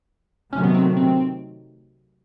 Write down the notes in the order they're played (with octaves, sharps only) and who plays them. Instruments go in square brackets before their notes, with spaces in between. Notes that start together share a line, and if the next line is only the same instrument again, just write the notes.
[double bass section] C3 D#3 F#3 A3 [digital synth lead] C#4
[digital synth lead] B3
C4
C4